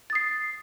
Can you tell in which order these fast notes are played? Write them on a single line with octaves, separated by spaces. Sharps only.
A6 D#6 C7